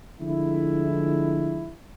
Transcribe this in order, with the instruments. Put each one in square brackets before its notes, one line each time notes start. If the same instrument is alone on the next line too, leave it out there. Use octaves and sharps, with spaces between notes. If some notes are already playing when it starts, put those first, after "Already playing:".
[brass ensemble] D3 F3 G#3 A3 E4